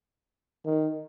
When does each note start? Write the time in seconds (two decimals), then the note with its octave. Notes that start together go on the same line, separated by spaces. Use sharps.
0.66 D#3